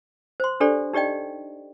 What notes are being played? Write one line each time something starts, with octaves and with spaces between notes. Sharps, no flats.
C5 C6
D4 G4 A4 C5 D5
D#4 G4 D5 D#5 G5